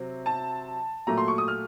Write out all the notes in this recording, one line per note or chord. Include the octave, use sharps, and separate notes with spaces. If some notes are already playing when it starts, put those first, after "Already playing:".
Already playing: C3 F#3 C4
A5
A#2 F#3 A3 A#5
C6
C#6
D#6
F6